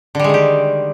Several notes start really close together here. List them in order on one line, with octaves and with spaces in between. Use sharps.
D3 G3 G#3 D#3 G4